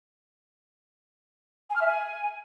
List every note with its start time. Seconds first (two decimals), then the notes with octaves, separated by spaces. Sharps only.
1.70 G#5
1.76 F6
1.81 E5
1.87 G#5